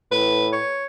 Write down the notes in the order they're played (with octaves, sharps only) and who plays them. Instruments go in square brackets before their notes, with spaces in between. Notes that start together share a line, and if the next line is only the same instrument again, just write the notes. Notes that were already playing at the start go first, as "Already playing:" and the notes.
[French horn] A2 [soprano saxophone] B4
[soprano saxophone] C#5